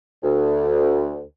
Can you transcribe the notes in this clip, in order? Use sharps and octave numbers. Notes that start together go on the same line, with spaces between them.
D2